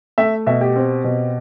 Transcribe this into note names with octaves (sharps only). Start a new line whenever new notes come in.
A3 E5
B2 E5
G4
C4
B2